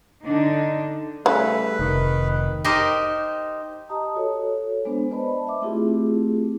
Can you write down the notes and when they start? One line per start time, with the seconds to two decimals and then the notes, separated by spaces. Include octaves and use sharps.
0.23 D3 D4 D#4
1.26 C#3 G3 A3 B4
1.79 F1 D#3
2.65 D#4 G4 A#4 C5 D#5
3.89 G4 D#5 A5 A#5 D#6
4.15 F#4 A4 C#5
4.85 G#3 B3 D4 C5
5.11 B4 C5 D5 D#5 A5 B5
5.47 E5 D6
5.62 A3 C4 E4 F4 G4 G#4